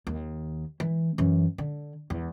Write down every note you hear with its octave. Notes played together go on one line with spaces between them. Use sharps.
D#2
E3
F#2 E3
D3
E2